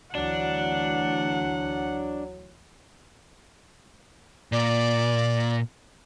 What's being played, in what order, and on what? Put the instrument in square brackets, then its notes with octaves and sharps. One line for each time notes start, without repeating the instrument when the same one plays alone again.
[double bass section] D2 E3 [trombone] F#3 [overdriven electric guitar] D4 [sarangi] F#5
[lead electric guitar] A#2 [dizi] D5